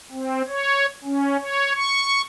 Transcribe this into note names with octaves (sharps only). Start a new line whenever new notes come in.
C4
C#5
C#4
C#5
C#6